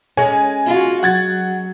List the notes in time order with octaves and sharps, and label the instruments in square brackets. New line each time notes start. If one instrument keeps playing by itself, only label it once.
[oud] G#3 C#4 [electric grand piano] G#5
[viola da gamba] F4 F#4
[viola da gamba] F#3 [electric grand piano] F#5 G#6 A6